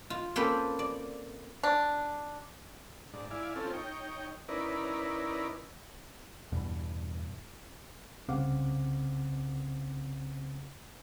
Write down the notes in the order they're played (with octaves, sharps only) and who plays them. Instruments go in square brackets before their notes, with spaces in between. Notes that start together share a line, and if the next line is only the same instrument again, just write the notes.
[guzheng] F4
A#3 C4 C#4 A4 B4
D5
[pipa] D4
[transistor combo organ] G#2 D4
E4 D5 F5 G#5
C4 C#4 F4 A4
D#4 C#5 G5
C#4 D#4 E4 A#4 B4 D5
[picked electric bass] E2 G2 B2
[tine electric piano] C2 C#3 C4 F5 F#5 D6